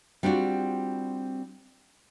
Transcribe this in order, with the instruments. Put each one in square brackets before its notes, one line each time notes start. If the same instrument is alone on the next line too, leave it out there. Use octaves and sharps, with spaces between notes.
[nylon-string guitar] G3 C4 D4 F4 F#4